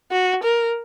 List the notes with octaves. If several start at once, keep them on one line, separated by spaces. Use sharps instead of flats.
F#4
A#4